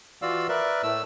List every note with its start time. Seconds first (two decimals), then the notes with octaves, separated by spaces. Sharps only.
0.22 E3 F4 F#4 D5 F5 E6
0.49 A#4 B4 D5 E5
0.83 A2 A3 E6